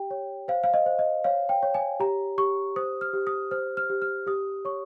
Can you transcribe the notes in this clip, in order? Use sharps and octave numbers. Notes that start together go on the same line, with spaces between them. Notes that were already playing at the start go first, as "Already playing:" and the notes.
Already playing: G4 G5
C#5
C5 F5
F5
D#5
C5
D#5
C#5 F5
G5
C#5
G#5
G4 A#5
G4 C#6
C5 D#6
F6
G4
D#6
C5 F6
F6
G4
F6
G4 D#6
C#5 C#6